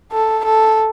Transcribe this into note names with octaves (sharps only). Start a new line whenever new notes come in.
A4
A4